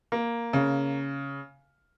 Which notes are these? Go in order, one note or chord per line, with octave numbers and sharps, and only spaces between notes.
A#3
C#3